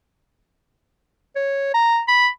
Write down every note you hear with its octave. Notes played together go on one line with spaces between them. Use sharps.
C#5
A#5
B5